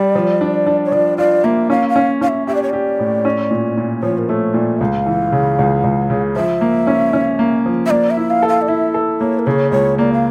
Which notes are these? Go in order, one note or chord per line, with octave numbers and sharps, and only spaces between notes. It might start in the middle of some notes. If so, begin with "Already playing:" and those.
Already playing: G3 D5
F3
D4
D4
C#5
F3 D5
F4 D5
A#3 E5
C#4 F5
F5
C#4
C#4 F5
E5
G4 E5
D5
C#5
G4 D5
A2
C#4
A#2
A#2
F3 C#5
A#4
A3 C#5
A#2 D5
C#2 F5
E3
C#3
C#2
C#2
C#3
F3 E5
A#3
C#4
C#4
A#3
F3
E5
A#3 D5
E5
E4
F5
A4
F5
D5
E4 E5
A4
A#3 C#5
A#4
C#3 C#5
C#2 C#5
A#3 D5
F5